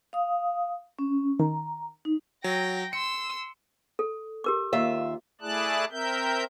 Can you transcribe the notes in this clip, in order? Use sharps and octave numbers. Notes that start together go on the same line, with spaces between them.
F5 D#6
C#4
D#3 A#5
D#4
F#3 G5 A#6
C6 E6 C#7
A4
G4 A#4 D6
D#2 F4 E5
A3 E4 G#4 D5 A5 F#6
C4 A#4 E5 G6